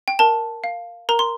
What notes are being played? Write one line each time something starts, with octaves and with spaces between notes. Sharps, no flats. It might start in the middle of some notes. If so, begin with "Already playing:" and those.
G5
A#4 A5
F5
A#4 A#5
C6